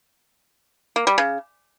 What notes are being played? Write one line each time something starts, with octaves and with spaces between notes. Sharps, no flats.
A#3
G3
C#3